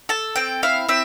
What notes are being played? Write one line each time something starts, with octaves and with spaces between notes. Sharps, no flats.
A4 A5
C4 G5
E4 F5
C4 E5